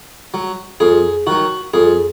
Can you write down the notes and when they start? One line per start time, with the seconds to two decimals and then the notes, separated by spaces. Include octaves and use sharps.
0.34 F#3
0.80 F2 G#4
1.27 D#3 F#3 F#4
1.74 F2 G#4